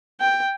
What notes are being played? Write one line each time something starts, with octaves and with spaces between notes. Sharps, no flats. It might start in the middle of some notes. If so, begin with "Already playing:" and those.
G5